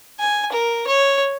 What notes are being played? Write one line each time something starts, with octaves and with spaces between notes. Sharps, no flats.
G#5
A#4
C#5